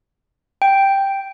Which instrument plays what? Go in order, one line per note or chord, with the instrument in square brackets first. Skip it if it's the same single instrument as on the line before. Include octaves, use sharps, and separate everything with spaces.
[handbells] G5